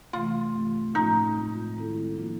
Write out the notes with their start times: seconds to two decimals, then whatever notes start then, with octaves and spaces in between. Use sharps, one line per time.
0.13 C3 E3 A3 F4
0.54 G2 E3 A3 C4
0.95 A2 F3 A3 C#4 D#4 F4
1.35 G#3 C4 F4
1.77 D#3 G#3 C4 E4 A4
2.17 F3 A#3 D4 F4